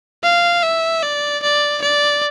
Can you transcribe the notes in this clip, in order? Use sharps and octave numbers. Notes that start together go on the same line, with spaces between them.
F5
E5
D5
D5
D5